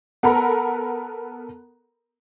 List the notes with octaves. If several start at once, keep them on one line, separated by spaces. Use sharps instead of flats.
B3 A4 A#4 F#5 A#5 B5